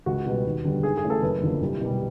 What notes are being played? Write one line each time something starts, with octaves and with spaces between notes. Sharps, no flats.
C#2 F#4
B2 G3 B3
D#2
D3 G3 B3
G#2 G#4
G#4
E3 A3 C#4
A4
F#1 B4
F#2 D3 F3 A#3
C2
B2 G3